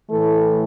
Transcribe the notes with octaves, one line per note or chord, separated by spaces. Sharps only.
A2 E3 A3 A4